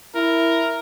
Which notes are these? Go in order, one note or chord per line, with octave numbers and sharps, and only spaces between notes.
E4 A#4